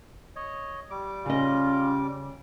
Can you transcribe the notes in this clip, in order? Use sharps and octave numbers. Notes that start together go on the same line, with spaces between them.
C#5 D#5
G3 D6
C#3 C#4 F4 D#5